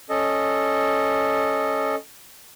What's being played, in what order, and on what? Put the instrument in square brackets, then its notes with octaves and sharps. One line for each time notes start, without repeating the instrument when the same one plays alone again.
[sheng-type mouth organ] C#4 A4 D#5